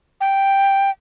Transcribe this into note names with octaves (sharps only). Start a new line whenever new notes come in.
G5